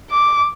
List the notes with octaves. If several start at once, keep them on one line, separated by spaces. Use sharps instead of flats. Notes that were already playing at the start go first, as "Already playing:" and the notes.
D6